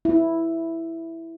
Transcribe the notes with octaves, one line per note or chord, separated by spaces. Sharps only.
E4